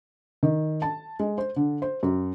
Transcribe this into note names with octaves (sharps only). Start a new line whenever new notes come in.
D#3
A5
G#3
C5
D3
C5
F#2